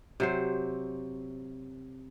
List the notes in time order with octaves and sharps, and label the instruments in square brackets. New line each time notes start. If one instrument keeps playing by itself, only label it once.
[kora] C3 F#3 C5